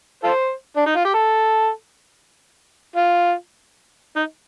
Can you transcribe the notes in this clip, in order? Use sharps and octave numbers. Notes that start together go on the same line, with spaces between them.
F4 A4 C5
D4
D#4
F4
G4
A4
F4
D#4